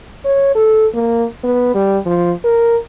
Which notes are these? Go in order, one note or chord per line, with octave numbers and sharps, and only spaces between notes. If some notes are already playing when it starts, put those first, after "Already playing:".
C#5
A4
A#3
B3
G3
F3
A#4